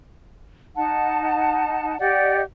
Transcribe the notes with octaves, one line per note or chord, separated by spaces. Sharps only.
D#4 F#5 A5
G4 D5 D#5 F#5